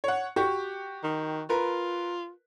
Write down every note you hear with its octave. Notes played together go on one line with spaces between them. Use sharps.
C#5 F#5
F#4 G4 C#6
D#3
F4 A#4 B4